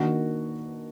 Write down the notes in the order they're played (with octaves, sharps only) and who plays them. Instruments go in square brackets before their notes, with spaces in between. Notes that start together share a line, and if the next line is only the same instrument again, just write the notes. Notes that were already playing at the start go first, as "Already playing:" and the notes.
Already playing: [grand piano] D#3 A#3 D4 F#4